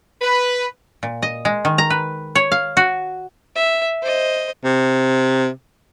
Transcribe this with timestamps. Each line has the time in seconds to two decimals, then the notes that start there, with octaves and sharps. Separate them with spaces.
0.22 B4
1.03 A#2
1.23 D#5
1.45 G#3
1.65 D#3
1.78 A#5
1.90 B4
2.35 C#5
2.52 F5
2.77 F#4
3.55 E5
4.02 C5 D#5
4.64 C3